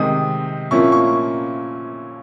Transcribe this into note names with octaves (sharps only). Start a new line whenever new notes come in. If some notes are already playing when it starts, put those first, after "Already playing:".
Already playing: C3 D#3 G#3 D#6
A#2 F3 A#3 C#4 E4 C#6
C#6